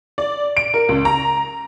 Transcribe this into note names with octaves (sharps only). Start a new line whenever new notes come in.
D5
D7
A#4
C#2
A#5